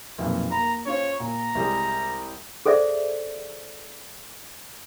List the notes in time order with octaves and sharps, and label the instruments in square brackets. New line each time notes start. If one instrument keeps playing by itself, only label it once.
[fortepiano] B1 F2 A#2
[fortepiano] A#3 B5 [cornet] A#5
[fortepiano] C#4 F4 C5 [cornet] C#5
[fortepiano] A#2 [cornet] A#5
[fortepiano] C2 G3 G#3
[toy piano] G#4 A4 C5 D5 E5